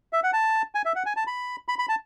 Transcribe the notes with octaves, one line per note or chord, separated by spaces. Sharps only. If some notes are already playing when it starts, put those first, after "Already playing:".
E5
F#5
A5
G#5
E5
F#5
G#5
A5
B5
B5
B5
A5